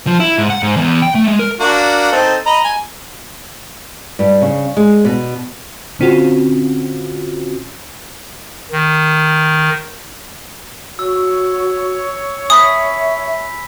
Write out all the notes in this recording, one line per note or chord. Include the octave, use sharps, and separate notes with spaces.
F3
E4
G#2
F#5
G#2
E2
G5
A3
G#3
A#4
A#3 D4 F#4
C4 D#4 A4
D#5 A#5 B5
G#5
G2
C#3
G#3
B2
A#2 D3 C4 C#4 F4 F#4
D#3
F#4 C#5 E6
E5 G#5 B5 D#6 B6